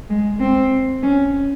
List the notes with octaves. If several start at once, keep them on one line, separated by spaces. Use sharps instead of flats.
G#3
C4
C#4